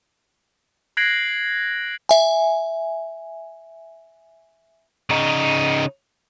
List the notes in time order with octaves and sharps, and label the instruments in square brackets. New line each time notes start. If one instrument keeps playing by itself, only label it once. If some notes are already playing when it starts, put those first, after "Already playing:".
[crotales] F#6 G#6 A#6 C7 D7 F#7
[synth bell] E5 G#5
[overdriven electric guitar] C#3 D#4